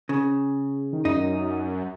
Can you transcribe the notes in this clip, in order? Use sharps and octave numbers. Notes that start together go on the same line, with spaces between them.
C#3
D#3
F#2 D#4